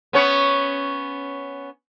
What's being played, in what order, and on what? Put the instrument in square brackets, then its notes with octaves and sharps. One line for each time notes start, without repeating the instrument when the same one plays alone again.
[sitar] B3 C#4 C#5